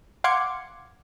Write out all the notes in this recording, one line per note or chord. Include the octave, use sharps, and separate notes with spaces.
F5 F#5 C6 D6 G#6 C#7